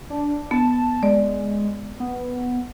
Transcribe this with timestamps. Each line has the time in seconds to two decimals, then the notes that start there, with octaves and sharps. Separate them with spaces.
0.10 D4
0.51 B3 A5
1.03 G#3 D5
2.00 B3